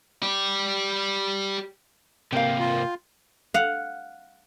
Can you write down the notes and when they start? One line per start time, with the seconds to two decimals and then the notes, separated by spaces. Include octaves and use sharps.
0.23 G4 D5
2.33 C3 A#3 F5 G5
2.59 F4
3.54 F5 F#5